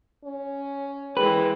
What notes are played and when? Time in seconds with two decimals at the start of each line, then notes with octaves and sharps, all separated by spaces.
0.25 C#4
1.17 E3 G#3 G#4 A#4 B4 G5